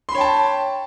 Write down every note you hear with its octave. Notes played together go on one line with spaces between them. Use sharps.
C#5 G5 A5 B5 C6